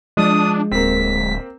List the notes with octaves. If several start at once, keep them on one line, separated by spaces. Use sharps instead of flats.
F3 G#3 D4 D#6
D1 A#3 C4 B6